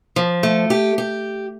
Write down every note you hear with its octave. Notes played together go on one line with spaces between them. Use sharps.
F3
A3
G4
G4